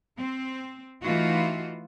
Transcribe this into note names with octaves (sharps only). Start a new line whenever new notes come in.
C4
E3 A3 D#4 F4 F#4